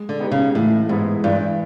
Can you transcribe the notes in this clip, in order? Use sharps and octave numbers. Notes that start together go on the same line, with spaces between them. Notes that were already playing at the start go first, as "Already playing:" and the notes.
Already playing: G#3
D3
B3 D#4 G4 B4
C#3
A2 E3
G#2 G#3 B3 E4
G2 E3